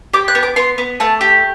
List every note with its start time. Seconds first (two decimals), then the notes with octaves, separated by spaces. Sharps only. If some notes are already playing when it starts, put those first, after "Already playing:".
0.13 G4 D6
0.28 F#6
0.35 B3
0.43 D6
0.56 B3 C6
0.78 B3
1.00 A3 A5
1.21 G4